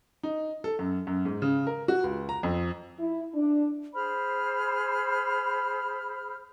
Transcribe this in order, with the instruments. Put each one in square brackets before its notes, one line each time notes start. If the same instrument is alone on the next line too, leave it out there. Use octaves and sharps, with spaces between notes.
[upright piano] D#4
A4
F#2
F#2
G#2
C#3
A#4
F#4
C#2
A#5
F2
[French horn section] E4
D4
[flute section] G#4 C5 B5 F6